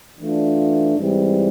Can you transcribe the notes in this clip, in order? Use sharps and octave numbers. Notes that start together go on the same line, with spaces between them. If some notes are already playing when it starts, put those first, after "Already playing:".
E3 A3 D4 F4
G#2 E3 G3 C4